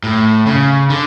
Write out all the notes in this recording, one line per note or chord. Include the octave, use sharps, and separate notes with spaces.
A2
C#3
D3